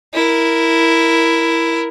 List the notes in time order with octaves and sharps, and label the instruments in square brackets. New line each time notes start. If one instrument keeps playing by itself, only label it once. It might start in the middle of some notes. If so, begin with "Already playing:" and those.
[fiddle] E4 A#4